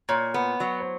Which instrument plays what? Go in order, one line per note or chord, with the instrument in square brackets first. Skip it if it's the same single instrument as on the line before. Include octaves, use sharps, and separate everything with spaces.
[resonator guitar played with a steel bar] A#2 [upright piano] C#5
[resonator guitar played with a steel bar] B3
F#3
[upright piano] C5